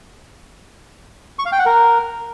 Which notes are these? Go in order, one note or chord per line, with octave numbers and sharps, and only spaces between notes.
C#6
F5
G5
F#5
A#4